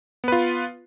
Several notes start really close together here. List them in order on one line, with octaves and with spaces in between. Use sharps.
B3 B4 F4